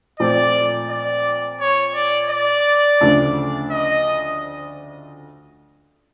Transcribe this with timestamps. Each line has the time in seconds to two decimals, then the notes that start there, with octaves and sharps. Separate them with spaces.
0.20 A#2 F3 A3 C4 D5
0.90 D5
1.61 C#5
1.95 D5
2.30 D5
3.01 D2 C#3 F3 A3 D4
3.71 D#5